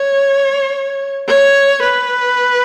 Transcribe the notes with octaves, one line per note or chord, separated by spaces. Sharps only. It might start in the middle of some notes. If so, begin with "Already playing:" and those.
Already playing: C#5
C#5
B4